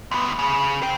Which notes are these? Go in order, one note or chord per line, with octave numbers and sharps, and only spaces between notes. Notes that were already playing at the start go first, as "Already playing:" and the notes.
D2 B3
C#3
C5 G5